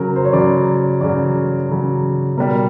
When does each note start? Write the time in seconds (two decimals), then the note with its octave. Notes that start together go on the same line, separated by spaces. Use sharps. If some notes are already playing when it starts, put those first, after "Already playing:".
Already playing: C#3 F#3 A#4
0.16 C5
0.25 C#5
0.33 C#3 F#3 D5
1.01 C#3 F#3 D5
1.69 C#3 F#3
2.37 B2 G3 A#4